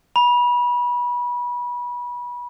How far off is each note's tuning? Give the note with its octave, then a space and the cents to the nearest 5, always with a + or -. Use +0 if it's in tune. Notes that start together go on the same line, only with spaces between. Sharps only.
B5 -25